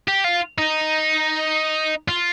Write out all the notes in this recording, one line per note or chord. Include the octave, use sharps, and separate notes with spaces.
G4
F4
D#4
F4